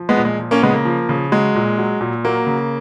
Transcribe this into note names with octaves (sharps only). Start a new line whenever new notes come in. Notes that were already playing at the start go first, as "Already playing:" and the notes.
Already playing: F3
G#3 B3
A#2
G#3
F3
A#3 C#4
C#3 G#3 B3
A#3
F3
C#3
F#3 G#3
A#2
F#3
A#2
F#3 A#3
C#3